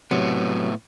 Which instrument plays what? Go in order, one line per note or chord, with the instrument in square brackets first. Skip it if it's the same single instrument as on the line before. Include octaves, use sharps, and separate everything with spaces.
[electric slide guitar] A2 B3 [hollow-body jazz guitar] C3 F#3